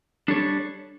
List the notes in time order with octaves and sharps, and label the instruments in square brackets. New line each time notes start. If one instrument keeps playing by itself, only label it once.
[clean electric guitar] G3 D4 A4 C#5